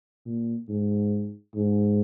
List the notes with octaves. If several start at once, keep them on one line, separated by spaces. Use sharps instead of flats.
A#2
G#2
G#2